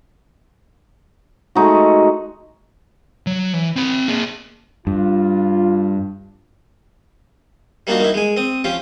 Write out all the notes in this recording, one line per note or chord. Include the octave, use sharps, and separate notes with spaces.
G#3 A3 D#4 F#4
F#3
E3
C4 B5
A#3 G#4
G2 F4
G3 A#3 D4 D#4 F4 F#4
A#3 D#4 E4
G#3 G#5
C4 D#6
F3 C#4 F4 G4